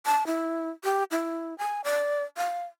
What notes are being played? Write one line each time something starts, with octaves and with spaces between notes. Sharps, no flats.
A5
E4
G4
E4
G#5
D5
F5